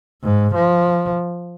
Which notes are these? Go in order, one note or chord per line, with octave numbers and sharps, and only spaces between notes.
G#2
F3